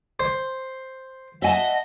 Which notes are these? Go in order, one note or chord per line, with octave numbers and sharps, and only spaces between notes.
C5
D#5 E5 F#5 G#5 A5